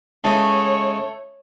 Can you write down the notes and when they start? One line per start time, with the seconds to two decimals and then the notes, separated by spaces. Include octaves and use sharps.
0.24 C#3 E3 G#3 A3 D#4 C#5 A5